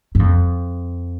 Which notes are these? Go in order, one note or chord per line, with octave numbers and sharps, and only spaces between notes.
G2
F2